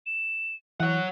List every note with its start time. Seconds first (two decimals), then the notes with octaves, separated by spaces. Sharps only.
0.06 E7
0.80 E3 C#5 F#5 F#6